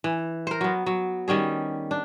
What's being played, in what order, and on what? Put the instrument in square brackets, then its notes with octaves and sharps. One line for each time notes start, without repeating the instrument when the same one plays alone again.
[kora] E3
A#4 C5
F#3 B3
F#3
D#3 G3 C#4 G#4
D4